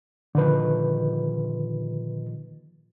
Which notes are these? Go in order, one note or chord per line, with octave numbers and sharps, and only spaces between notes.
A#2 D3 D#3 F3 B4